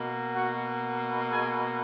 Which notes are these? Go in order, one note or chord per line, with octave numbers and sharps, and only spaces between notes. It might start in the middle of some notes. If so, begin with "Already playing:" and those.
Already playing: B2 A#3
F#4 F#5
G#4 G#5